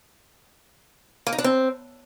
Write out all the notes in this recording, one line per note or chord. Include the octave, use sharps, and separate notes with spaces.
A#3
D#4
D4
C4